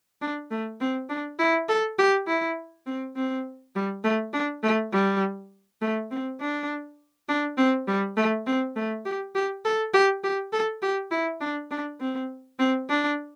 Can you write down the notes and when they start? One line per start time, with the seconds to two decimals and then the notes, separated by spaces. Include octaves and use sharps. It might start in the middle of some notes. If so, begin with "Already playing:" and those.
0.21 D4
0.51 A3
0.80 C4
1.09 D4
1.39 E4
1.69 A4
1.98 G4
2.27 E4
2.86 C4
3.16 C4
3.75 G3
4.04 A3
4.33 D4
4.63 A3
4.93 G3
5.81 A3
6.11 C4
6.41 D4
7.29 D4
7.58 C4
7.88 G3
8.17 A3
8.46 C4
8.76 A3
9.05 G4
9.35 G4
9.65 A4
9.94 G4
10.24 G4
10.53 A4
10.82 G4
11.11 E4
11.41 D4
11.71 D4
12.00 C4
12.59 C4
12.89 D4